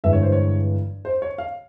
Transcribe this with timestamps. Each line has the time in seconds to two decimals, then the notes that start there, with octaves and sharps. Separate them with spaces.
0.04 G1 G2 E3 G#3 E5
0.13 C#5
0.22 C5
0.32 C#5
1.05 C5
1.22 C#5
1.38 F5